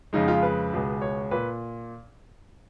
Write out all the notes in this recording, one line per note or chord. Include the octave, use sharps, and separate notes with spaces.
F2 C#3 G#3 D#4
F4
B4
C#2 B2 G#3
C#5
A#2 B4